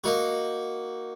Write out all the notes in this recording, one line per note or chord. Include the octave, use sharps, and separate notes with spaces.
A#3 D#4 F#4